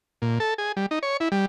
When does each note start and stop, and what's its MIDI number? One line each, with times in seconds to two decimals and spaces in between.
0.22 0.39 46
0.40 0.54 69
0.58 0.72 68
0.77 0.86 55
0.91 0.99 63
1.03 1.17 73
1.20 1.29 64
1.32 1.46 55